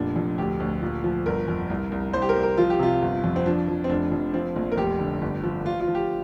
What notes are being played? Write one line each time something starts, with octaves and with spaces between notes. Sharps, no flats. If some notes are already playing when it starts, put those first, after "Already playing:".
Already playing: F1 A#2 D4
F2
D2 G4
D2
A#2
F3
G1 A#4
F2
C2
C2
C2 C5
G4
A#4
C2
A#4
F3 F4
G4
C3 F4
G1
F2
C4
F3 D4
F3
C4
F1 D4
F2
F3 C4
A#1
A#4
F1 G4
D3
G1
F3
F3 F4
F4
F3
G4